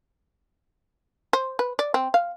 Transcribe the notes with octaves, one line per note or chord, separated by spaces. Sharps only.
C5
B4
D5
C4
F5